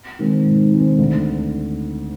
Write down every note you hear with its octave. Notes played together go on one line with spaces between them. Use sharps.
D#3 G#3 C4
G#2
D#3 G#3 C4
D2